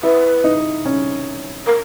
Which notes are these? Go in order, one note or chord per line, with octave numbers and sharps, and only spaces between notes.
E4 B4
D#4
C#4
A#4